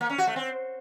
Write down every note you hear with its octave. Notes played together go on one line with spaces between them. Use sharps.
A#3
C#4
F#4
A3
C4